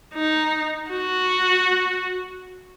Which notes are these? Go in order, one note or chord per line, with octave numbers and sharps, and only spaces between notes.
D#4
F#4